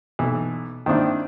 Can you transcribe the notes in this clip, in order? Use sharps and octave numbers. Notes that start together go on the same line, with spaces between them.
B1 E3
D#3 A#3 C4 D4 E4